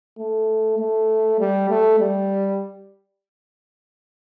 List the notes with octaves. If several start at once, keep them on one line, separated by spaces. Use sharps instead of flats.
A3
A3
G3
A3
G3